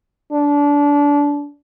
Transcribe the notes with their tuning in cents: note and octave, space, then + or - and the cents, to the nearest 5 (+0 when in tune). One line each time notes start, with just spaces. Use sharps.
D4 -25